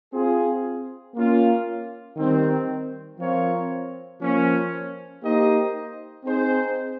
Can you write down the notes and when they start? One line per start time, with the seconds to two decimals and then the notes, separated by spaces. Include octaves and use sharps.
0.13 C4 F4 G#4
1.15 A#3 C#4 F4
2.17 D#3 G3 C4
3.19 F3 C4 F4 A#4 C#5
4.21 F3 A#3 C#4
5.22 A#3 D#4 G4 C5 D#5
6.24 C4 D#4 G#4 C5